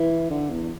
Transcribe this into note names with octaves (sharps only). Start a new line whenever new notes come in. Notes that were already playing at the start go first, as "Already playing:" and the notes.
Already playing: E3
D3
E2